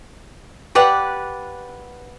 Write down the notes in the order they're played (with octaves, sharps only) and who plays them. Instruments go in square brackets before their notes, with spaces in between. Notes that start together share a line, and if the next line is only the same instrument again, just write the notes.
[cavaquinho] G4 B4 D5 F#5